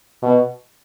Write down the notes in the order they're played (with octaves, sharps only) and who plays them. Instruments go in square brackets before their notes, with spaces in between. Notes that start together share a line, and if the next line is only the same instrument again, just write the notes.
[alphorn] B2